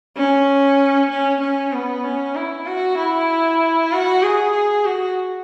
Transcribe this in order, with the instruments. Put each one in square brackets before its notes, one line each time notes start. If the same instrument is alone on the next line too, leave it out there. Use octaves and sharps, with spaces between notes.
[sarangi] C#4
C#4
C#4
B3
C#4
E4
F#4
E4
F#4
G#4
F#4